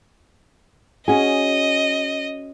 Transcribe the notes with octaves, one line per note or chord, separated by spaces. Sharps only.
C#4 F#4 G#4 D#5